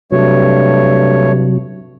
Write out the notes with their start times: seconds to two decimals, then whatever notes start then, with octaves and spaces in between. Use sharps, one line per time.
0.12 G2 C3 F#3 A3 C#5